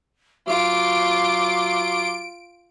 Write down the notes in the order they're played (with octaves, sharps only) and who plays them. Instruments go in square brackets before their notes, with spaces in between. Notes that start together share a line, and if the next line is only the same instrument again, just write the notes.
[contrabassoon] F#3 [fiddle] F4 [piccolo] D6 [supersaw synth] D7